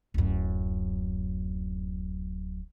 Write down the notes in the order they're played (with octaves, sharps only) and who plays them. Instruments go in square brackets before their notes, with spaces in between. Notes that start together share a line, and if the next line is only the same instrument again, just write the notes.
[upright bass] D1 F#2